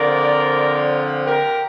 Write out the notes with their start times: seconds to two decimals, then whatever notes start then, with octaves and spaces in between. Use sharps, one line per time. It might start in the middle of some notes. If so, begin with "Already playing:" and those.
Already playing: D3 F3 C4 A#4 D5
1.25 G4 A#4